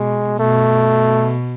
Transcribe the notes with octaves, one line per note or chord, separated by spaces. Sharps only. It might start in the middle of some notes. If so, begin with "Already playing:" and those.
Already playing: B2 G#3
B2 A3